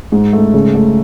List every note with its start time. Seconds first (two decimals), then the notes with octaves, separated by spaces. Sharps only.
0.12 G#2
0.33 A3
0.54 C#3
0.75 A3